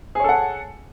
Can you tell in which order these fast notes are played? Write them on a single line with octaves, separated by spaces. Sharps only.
G#4 C#5 A4 F#5